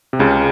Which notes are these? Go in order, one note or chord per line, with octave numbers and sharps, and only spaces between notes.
C3
C#2 C#3